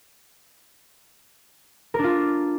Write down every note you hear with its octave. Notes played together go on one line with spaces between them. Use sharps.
D4 F4 A#4